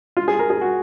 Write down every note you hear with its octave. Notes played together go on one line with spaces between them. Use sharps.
F4
G#4
A#4
G#4
F#4